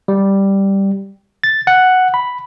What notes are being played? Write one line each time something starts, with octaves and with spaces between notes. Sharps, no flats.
G3
A6
F#5
B5